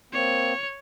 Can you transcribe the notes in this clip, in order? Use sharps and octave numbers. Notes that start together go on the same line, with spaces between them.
A#3 C4 C#5